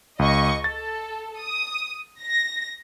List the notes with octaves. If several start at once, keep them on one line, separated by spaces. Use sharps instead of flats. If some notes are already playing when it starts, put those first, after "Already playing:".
C#2 D#5 C#6
A4 A6
D#6
A#6